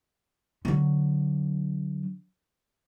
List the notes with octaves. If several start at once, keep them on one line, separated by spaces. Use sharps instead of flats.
D3 F#3